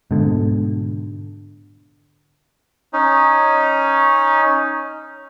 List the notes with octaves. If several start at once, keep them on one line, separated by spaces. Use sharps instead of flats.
G#2 B2 D3
C#4 D#4